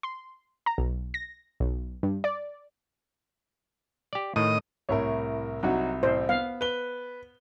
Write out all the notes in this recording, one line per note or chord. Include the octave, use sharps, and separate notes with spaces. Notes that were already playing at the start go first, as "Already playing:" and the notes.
C6
A#5
B1
A#6
B1
G2
D5
G4 D5
A2 D#3 D#5
C2 A2 A#4 C#5
C2 F#3 D#4 F#4
A1 C5
B3 F5
B4 G7